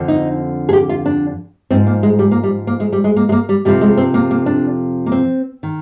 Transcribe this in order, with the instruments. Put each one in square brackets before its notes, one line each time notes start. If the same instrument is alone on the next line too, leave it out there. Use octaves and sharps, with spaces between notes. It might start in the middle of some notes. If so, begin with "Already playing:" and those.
Already playing: [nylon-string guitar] F2 D3 F3
D#4
G#4
G4
F4
D4
G#2 F3 C4
A#3
G#3
G3
A#3
G3
A#3
G#3
G3
G#3
A#3
G#3
A#3
G3
F2 C3 F3 G3
G#3
C4
A#3
A#3
D4
A#3
C4
D#3